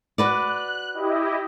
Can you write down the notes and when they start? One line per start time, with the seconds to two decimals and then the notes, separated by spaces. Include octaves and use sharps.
0.18 F#4 B4 D5 F#6
0.94 E4 G4 D#5